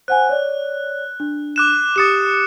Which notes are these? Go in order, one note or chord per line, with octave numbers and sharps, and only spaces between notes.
C5 F#5 G#5 F#6
C#5 D5
D4
D6 F#6 E7
G4 D6 D#6 A6 C#7 E7